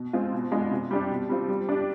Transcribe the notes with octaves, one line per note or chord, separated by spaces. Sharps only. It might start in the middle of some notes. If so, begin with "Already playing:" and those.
Already playing: B2
G#3 C4 F4
B2
G#3 B3 D4 F4
C3
G3 D4 G4
B2
G3 C4 F4
G3
D4 G4